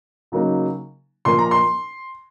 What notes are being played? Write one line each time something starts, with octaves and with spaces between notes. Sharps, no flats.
C#3 F#3 A#3 D#4
A#2 F3 A#3 C6
A#5
C6